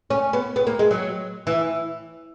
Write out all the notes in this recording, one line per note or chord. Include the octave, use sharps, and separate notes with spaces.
C#4
B3
B3
A#3
G#3
F#3
E3